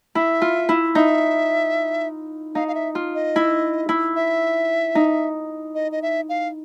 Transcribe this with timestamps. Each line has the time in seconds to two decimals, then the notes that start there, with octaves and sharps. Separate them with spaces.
0.15 E4 E5
0.42 F4
0.69 E4
0.95 D#4 E5
2.55 D#4 F5
2.68 F5
2.75 E5
2.95 F4
3.15 D#5
3.36 E4
3.89 E4
4.16 E5
4.95 D#4
5.75 D#5
5.92 D#5
6.02 E5
6.29 F5